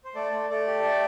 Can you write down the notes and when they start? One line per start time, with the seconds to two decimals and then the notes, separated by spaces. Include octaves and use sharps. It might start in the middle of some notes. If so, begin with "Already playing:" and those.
0.05 C5
0.15 A3 A4 D5
0.32 A3
0.50 A3 A4 D5
0.67 G4
0.84 A3